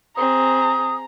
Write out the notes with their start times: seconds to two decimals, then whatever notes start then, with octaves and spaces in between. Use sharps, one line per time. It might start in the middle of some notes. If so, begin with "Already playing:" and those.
0.17 C4 G#4 A#5 D#6